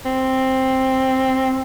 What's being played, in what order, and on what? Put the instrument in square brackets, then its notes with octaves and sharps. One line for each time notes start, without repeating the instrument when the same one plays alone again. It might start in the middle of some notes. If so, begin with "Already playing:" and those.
[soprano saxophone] C4